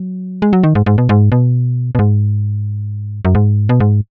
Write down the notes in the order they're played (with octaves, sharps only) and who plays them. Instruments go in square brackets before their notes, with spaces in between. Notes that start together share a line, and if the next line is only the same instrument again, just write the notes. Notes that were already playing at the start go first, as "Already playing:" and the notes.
Already playing: [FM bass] F#3
G#3
F#3
D#3
G#2
G#2
B2
G#2
B2
B2
G#2
F#2
G#2
B2
G#2